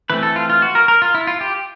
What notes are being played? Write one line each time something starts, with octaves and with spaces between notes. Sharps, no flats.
E3 A3 C4 B4
A4
F4
F4
F#4
A#4
A#4
F4
E4
F4
G4